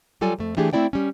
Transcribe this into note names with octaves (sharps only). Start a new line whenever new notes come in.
F#3 G3 F4 A4 D5 G#5
F2 A3
E3 A3 D4 G4 G#4
A3 C4 E4 D5 G5
G3 C#4